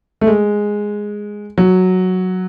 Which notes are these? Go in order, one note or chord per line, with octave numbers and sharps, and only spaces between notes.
A3
G#3
F#3